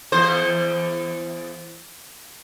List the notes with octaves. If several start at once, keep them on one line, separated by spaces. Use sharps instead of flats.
E2 C5